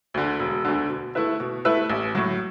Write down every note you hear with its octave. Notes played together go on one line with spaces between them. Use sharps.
D2 D3
E1
D2 D3
B2
A3 E4 B4 E5
B2
A3 E4 B4 E5
A1
A2 F#3